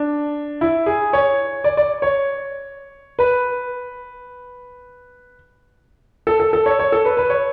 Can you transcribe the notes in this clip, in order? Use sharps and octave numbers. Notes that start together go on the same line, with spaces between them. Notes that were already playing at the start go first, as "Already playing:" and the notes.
Already playing: D4
E4
G#4
C#5
D5
D5
C#5
B4
A4
A4
A4
C#5
C#5
A4
B4
B4
C#5